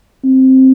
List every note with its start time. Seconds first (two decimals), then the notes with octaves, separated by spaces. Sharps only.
0.24 C4